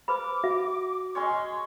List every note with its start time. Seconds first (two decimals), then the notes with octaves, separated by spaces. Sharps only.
0.08 B4 C5 B5 D6
0.44 F#4 E5
1.15 G#3 C#4 C#5 C6